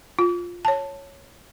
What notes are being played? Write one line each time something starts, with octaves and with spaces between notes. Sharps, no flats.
F4
C#5 A5